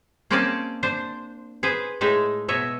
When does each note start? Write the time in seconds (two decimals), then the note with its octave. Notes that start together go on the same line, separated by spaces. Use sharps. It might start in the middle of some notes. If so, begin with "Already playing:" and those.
0.30 A#3 C4 C#4 D5 D#5 A5
0.83 D4 C5
1.63 G#4 B4 C5
2.01 A2 G#3 D#4 E5
2.48 B2 C#5 D#5 E5